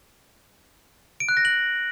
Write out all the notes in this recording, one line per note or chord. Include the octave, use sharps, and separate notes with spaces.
D7
F#6
A#6
F#7